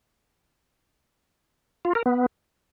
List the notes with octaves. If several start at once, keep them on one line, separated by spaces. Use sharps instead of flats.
F4
A#4
B3